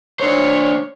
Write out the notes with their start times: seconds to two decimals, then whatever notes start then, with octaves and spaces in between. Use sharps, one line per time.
0.20 D4 C5 C#5